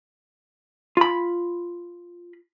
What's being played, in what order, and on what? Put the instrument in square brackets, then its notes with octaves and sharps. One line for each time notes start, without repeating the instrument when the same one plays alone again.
[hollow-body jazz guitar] F4 B5